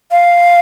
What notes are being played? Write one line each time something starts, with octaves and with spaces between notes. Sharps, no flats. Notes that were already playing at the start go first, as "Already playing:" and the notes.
F5